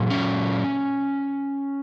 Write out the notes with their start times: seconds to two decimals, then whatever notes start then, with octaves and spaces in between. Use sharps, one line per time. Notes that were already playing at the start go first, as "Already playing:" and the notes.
Already playing: A#2 F#3
0.10 C#4